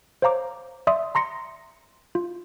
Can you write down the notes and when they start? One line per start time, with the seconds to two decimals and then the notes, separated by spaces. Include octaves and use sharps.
0.22 C5 C#5 F5 A#5 D6
0.87 D5 E5 C6 D#6
1.15 A#5 C6 A#6 C#7
2.15 F4